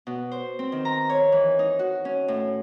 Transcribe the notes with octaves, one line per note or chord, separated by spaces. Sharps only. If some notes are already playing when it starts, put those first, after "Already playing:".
B2
C5
C4
D#3
A#5
C#5
E3
D#4
F#4
C#4
A2